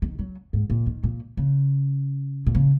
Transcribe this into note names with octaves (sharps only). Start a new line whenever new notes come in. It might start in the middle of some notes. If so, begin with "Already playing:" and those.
D#3
F#3
G#2
A#2
D#3
A#2
C#3
A#2
C#3